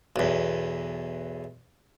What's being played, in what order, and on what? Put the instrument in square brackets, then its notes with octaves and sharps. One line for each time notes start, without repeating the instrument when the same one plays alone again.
[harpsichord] B1 E2